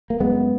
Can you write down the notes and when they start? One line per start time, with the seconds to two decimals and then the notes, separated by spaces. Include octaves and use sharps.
0.10 A#3
0.20 F#2 G#3 B3